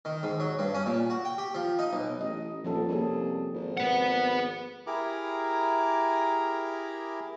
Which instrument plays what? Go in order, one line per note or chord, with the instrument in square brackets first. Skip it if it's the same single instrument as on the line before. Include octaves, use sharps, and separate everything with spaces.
[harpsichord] D#3
G#2
F#3
G2
C#4
A#2
F#4
G5
G4
F3
D#4
B1
[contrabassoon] A1 [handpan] D#5
[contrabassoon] D#1 [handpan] F3 C#4 A4
[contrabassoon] C2 [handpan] A#3 C4 G#4
[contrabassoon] G#1
[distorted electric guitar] B4 F#5
[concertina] E4 G4 G#4 A#4 A#5 D6